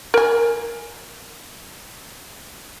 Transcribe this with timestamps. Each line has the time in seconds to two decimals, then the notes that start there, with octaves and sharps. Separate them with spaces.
0.14 A#4 G#5